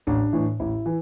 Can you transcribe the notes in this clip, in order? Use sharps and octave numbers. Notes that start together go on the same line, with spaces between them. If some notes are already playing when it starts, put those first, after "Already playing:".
A1 D4
A2 E3
A1 E4
E3